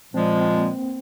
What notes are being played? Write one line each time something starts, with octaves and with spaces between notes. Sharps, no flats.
A#2 F3 G#3 C4
C4
A#3